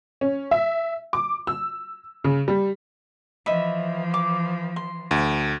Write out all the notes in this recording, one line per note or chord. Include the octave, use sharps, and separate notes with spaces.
C#4
E5
D6
E6
C#3
G3
E3 F3 D#5 E5 B5
D6
C6
D2